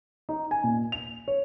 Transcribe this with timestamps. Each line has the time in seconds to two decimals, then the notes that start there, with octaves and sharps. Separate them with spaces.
0.29 D#4
0.51 G#5
0.64 A#2
0.92 F7
1.28 C#5